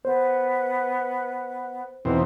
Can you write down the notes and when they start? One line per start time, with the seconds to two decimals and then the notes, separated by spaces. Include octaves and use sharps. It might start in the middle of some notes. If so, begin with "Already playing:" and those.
0.05 B3 C5
2.05 E2 B2 C4 D#4